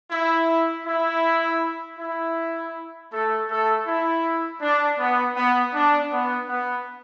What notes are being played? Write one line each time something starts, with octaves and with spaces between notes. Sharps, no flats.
E4
E4
E4
A3 A4
A3 A4
E4
D4
B3
B3
D4
B3
B3